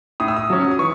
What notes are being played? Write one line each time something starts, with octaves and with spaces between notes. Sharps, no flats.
A2 D#6
E6
D#6
F#3 C#4
D#6
E3 C#6